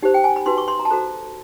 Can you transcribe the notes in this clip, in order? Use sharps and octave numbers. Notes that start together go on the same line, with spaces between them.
D#4 G4 C5
G5
G#5
B5
D#4 F#4 B4 C6
C#6
C6
A#5
A5
F#4 A4 C5 A#5